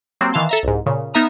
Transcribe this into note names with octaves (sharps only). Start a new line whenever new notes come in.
F#3 G3 A#3 C4
D#3 E3 F5 A5 C6
A4 E5 A#5
C2 G#2
A#2 C#3
B3 D#4 E5 A#5 D#6 F6